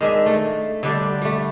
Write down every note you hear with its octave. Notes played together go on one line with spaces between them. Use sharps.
D#3 G#3 D4 E5
A3
D3 G3 D4
G3 A3